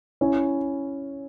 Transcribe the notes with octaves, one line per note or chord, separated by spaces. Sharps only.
C#4 E4